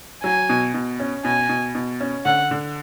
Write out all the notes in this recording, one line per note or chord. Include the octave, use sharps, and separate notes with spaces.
F#3 G#5
B2
B2
C#4
B2 G#5
B2
B2
C#4
D3 F#5
D3